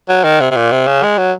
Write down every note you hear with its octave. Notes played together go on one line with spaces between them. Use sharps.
F#3
D#3
C3
C3
A#2
C3
C#3
G#3
F#3